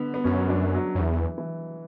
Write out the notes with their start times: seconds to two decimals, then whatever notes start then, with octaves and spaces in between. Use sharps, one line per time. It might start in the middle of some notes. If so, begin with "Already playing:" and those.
Already playing: D3 B3
0.14 B3
0.24 F#2 C#4
0.49 D4
0.74 F#3
0.95 F#2
1.00 E2 E3
1.38 E3